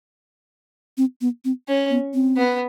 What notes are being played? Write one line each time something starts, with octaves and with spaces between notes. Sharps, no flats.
C4
B3
C4
C#4
B3
C4
B3